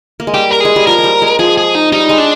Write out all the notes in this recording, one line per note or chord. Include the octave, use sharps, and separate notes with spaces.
A#3
G#3
G3 G4
A#4
G#3 G#4
G3
F3 A#4
G#3
G3
G#3
F3 G#4
G#4
D#4
G3 D#4
G#3
D4